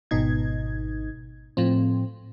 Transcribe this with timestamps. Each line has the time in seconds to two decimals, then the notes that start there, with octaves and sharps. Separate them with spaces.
0.11 G#1 B2 D#4 G#6
1.57 A2 F3 C4